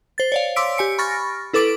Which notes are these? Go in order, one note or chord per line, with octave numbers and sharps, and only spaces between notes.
C5 A6
C#5 D5 F5
C6 D6 E6 B6 D7
G4 G#5 C#7
B5 C#6 F6 A6 A#6
E4 A4 B4 D6 A6 D7